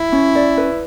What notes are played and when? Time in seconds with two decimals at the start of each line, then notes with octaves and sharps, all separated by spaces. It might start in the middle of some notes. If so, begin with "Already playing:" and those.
Already playing: E4
0.12 C#4
0.35 D5
0.57 B4